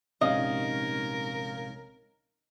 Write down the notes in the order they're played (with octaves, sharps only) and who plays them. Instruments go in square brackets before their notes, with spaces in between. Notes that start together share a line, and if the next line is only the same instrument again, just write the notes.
[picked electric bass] A#1 G#2 C3 [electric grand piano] C#4 D#4 F5 [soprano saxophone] A#4 [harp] D#5